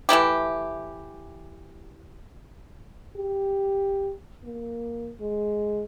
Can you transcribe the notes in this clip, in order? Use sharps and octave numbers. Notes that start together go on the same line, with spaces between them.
E3 A3 E4 G4
G4
A#3
G#3